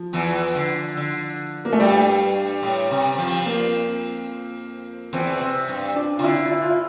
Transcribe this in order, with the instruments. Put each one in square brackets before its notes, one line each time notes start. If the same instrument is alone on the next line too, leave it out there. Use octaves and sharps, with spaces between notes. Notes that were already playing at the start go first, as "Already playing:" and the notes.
Already playing: [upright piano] F3
[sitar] E2 E3
D3
D3
[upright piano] A#3
A3
[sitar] G2 [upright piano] G3
[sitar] A2
C3
F2 F3
[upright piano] A#3
[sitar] E2 E3 [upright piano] C4
[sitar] C3
G2
[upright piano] D4
[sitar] C3 [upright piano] F4
[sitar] D3 [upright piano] E4
[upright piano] E4
F4
E4